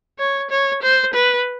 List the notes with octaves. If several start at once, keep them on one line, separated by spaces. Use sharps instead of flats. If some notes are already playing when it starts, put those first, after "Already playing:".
C#5
C#5
C5
B4